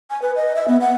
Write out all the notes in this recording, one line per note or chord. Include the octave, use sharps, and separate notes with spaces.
G#5
B4
D#5
E5
B3
F#5